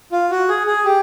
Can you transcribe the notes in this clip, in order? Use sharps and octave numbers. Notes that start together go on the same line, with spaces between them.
F4
F#4
G#4
G#4
G4